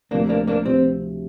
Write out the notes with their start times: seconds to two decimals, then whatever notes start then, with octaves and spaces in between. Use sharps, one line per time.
0.11 D2 C3 F3 A#3 D4
0.29 A#3 D4
0.47 A#3 D4
0.65 C3 F3 C4